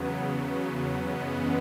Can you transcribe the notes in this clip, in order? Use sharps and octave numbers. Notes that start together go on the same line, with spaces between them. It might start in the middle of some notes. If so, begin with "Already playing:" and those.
Already playing: E2 C#3 F#3 B3
F#2 C#3 E3 G#3 B3 D#5